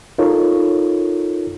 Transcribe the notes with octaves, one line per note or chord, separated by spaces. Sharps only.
D#4 F4 A4 A#4 C#5